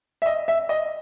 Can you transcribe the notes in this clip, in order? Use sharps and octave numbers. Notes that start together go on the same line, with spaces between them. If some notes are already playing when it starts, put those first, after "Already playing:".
E5
D#5
E5
D#5